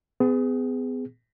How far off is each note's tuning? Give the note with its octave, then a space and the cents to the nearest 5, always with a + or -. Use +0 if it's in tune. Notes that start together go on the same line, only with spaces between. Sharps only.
B3 +35 G#4 -10